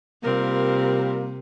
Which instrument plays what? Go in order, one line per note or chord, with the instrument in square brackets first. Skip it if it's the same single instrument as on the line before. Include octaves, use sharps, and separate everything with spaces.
[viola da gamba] C3 [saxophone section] G3 A#3 F4 [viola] C4 A#4